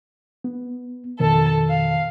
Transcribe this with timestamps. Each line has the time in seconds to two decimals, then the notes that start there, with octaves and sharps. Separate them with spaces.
0.44 B3
1.20 F2 B2 D#3 A4 A5
1.69 F5